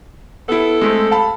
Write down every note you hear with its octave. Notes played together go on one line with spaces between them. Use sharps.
B3 E4 A4
G#3 A3 C4
F5 A5 B5